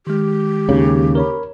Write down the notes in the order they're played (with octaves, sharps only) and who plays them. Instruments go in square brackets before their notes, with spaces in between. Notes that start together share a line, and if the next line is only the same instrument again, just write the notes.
[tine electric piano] D#3 G#3 [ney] G4
[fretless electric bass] D#2 C#3
[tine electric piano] A#4 C#5 B5